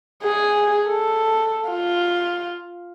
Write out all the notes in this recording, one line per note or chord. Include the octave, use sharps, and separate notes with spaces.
G#4
A4
F4